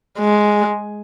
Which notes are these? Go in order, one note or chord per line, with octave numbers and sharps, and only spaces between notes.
G#3